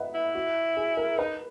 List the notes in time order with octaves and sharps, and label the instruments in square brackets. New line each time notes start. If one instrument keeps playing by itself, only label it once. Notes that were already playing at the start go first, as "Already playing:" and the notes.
Already playing: [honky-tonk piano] B4 D#5 E5 F#5
[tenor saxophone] E4
[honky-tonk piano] F#4
G#4
A#4
[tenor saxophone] D#4 [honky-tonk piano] B4